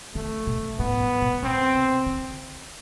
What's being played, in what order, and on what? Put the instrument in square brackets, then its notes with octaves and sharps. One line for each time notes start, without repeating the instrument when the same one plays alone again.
[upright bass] D3 [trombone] A3
[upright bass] B2
[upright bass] A2 [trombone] B3
[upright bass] A2
B2
[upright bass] B2 [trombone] C4
[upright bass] C3
D3